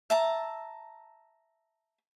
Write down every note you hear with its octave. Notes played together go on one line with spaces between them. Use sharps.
E5 A5 A#5